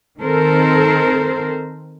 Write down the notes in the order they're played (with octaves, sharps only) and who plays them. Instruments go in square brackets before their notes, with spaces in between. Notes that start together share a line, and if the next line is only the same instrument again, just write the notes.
[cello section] D#3 C4 A4 A#4 C5